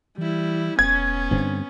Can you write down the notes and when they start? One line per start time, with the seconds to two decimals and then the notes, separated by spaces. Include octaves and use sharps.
0.18 E3 G3 E4
0.79 E1 B3 C#4 G#6
1.31 G2 D3 C4